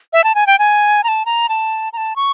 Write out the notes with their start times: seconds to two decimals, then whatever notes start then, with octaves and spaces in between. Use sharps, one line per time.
0.13 E5
0.24 A5
0.35 G#5
0.47 G5
0.59 G#5
1.04 A#5
1.08 A5
1.26 A#5
1.49 A5
1.93 A#5
1.97 A5
2.16 C#6